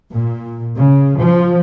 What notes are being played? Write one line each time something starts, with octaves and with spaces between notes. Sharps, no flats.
A#2
C#3
F3